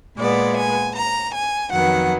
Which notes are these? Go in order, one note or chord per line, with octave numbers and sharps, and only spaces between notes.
A#2 G#3 B3 D5
G#5
A#5
G#5
F2 D#3 F#3 B3 F#5